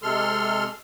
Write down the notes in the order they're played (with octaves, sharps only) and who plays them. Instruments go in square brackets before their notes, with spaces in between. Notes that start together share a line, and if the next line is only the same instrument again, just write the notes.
[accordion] C3 G#3 A4 C6 F6